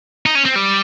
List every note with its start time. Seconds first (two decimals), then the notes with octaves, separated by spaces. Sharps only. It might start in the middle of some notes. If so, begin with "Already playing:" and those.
0.26 D#4
0.35 C#4
0.45 C4
0.56 G3